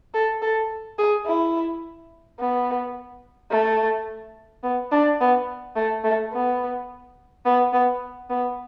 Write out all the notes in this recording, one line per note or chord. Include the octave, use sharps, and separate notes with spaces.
A4
A4
G#4
E4
B3
A3
B3
D4
B3
A3
A3
B3
B3
B3
B3